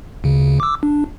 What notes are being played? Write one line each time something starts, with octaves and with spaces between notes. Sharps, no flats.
D2 C#3
D6 E6
D4